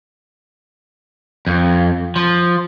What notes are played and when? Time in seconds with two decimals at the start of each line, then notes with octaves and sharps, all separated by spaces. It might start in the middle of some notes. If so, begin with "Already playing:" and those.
1.47 F2
2.16 F3